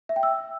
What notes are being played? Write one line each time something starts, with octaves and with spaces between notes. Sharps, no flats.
E5
G5
E6